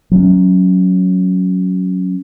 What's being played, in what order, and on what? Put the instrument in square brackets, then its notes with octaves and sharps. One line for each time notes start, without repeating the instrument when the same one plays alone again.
[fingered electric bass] F#3 C#4